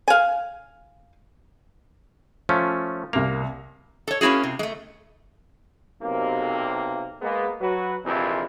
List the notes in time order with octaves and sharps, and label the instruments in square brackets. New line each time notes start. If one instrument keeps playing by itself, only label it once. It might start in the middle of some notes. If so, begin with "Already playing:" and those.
[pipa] F5 G#5
[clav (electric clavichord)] F3 A3 C#4
[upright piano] C2 F7 [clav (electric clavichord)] A#3
[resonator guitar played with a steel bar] A4 C#5
A#3 C#4 E4 F#4 G#4
C3
G#3 A3
[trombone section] B1 C3 A#3
G#3 A#3 B3
F#3 F#4 B4
A#1 F2 A2 C3 E3 E4